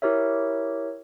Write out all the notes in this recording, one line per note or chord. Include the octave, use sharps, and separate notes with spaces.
E4 G4 A#4 C#5 E5